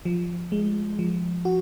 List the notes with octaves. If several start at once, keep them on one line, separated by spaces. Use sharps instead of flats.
F3
G#3
F3
F#4